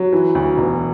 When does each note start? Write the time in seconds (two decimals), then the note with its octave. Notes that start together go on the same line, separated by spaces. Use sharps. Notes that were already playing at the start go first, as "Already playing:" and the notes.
Already playing: F#3
0.12 E3
0.35 D2
0.58 E1